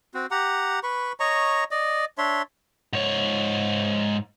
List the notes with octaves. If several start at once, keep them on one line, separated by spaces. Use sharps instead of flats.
C4 F#4
G4 F#5 A#5
B4 B5 C#6
C#5 D#5 A#5 C#6
D5 D#5
D4 C#5 E5 C6
G#2 C#5